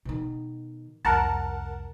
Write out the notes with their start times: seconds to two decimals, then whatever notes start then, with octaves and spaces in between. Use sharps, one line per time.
0.05 B2 D#3
1.05 C2 F2 A#4 F#5 A5